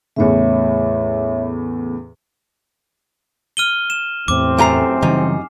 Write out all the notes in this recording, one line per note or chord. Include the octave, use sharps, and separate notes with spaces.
E2 A2 C#3 C#5 E5
F6 D#7 G7
E7
A1 E2 A2 C3 C4 D6
F#2 A3 G#5 A#5 C7
F#2 C#3 E3 G3 D#4